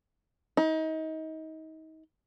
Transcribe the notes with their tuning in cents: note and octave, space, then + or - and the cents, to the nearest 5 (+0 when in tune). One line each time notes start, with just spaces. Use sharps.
D#4 +30